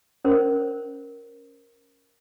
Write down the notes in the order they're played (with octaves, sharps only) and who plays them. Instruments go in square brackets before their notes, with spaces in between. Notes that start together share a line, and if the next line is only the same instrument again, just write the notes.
[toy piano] C#4 A#4 C5 C#5